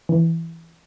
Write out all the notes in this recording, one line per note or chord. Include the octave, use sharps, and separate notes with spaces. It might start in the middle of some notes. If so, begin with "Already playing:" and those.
E3